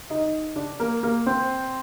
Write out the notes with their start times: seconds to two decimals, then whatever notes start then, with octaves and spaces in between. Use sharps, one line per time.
0.10 D#4 D#5
0.56 D4 D5
0.80 A#3 A#4
1.03 A#3 A#4
1.26 C4 C5